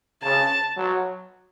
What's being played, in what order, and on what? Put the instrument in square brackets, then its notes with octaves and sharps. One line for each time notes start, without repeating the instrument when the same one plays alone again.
[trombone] C#3 [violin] A5
[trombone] F#3